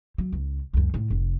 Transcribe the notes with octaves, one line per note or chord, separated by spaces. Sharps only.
F#3
C#2
C#2 F#2
A2
F1